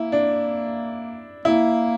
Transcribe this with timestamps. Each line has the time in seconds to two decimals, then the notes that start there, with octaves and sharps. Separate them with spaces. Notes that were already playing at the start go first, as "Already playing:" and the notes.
Already playing: A#3 E4
0.12 D4
1.45 A#3 E4